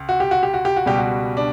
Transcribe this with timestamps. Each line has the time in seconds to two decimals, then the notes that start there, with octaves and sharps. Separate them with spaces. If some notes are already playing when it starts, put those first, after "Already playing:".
Already playing: C#2
0.09 F#4
0.20 G4
0.31 F#4
0.43 G4
0.54 F#4
0.65 G4
0.77 F#4
0.86 C#2 B2 G3 G4
0.98 F#4
1.37 D4